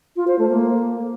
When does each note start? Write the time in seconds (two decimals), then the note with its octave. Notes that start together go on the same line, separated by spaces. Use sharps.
0.16 F4
0.27 C5
0.38 A3
0.50 A#3